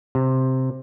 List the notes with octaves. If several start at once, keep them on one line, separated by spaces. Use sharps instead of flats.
C3